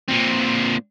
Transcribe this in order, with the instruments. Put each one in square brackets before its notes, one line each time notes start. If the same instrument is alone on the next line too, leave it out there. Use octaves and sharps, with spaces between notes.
[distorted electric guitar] A#2 C4